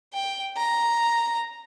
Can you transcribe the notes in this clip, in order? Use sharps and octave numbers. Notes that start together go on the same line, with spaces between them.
G5
A#5